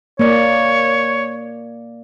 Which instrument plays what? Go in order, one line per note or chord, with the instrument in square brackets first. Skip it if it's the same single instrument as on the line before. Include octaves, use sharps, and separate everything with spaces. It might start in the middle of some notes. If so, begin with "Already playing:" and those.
[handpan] A#3 D5 [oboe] C#5